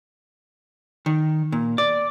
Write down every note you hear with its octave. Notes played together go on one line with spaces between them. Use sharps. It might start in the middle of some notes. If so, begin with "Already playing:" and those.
D#3
A#2
D5